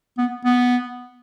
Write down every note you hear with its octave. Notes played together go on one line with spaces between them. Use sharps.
B3
B3